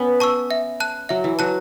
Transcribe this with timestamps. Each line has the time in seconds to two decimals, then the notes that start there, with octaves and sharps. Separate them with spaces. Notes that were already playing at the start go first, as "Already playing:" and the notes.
Already playing: B3 C#4
0.20 A5 C#6 E6
0.51 E5
0.80 A5 F#6
1.09 F#3 E5
1.24 E3
1.39 F#3 A5 F#6